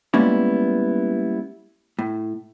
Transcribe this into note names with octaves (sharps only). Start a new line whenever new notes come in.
G3 G#3 A#3 B3 C#4 E4
A2